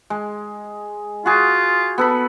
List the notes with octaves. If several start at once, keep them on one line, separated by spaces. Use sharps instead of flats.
G#3
F4 F#4 G#4
B3 A4 B5